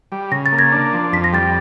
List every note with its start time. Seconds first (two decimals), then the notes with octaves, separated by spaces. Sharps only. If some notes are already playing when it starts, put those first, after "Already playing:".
0.12 G3
0.32 C#3 A#6
0.46 A6
0.52 A#3
0.58 G#6 A#6
0.72 D4
0.93 F3
1.12 F2 B6
1.24 A#6
1.33 G3 A6